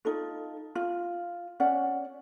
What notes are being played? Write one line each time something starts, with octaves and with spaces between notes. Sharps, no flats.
D#4 F4 A4
F4
C#4 D5 F#5